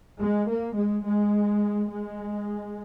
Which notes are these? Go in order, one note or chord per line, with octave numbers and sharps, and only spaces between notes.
G#3
A#3
G#3
G#3
G#3